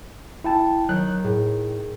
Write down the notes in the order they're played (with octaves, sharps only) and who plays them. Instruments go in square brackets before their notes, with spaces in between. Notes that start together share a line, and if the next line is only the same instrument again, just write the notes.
[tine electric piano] E4 G5 A5
[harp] D#3 [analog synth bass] F#3 [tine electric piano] F#6
[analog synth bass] A2 [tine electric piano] G#4